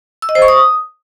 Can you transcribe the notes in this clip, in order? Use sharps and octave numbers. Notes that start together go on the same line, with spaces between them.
E6
D#5
C5
C#6
D#6